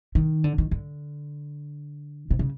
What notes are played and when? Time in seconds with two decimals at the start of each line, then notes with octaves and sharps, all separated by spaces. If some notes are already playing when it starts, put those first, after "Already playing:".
0.15 D#3
0.44 D3
0.58 D#3
0.71 D3
2.31 C3
2.39 C#3